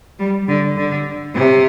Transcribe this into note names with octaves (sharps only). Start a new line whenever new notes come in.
G3
D3
D3
C3